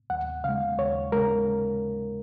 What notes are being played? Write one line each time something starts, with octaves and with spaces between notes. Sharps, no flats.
D#2 F#5
C#3 G#3 F5
D#2 C#5
C#3 G#3 A#4